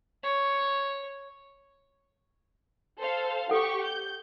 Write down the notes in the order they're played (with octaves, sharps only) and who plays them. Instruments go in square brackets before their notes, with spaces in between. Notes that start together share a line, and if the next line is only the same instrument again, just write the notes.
[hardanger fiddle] C#5
[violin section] A4 C5 F5
[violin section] G4 C#6 [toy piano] A4 F#5
[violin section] G6